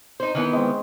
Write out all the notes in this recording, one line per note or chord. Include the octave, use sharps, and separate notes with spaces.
D#4 C5
D#3 E3 B3
G#3 C4 C#6